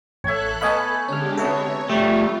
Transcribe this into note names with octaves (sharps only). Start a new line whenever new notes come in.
A1 A4 C#5 E5 F#6 G#6
A3 B3 D#5 F5 G#5 B5
D3 G#3 C#4 G4 F6
C3 F#3 B3 A4 C#5 E5
G3 A3 F4 G4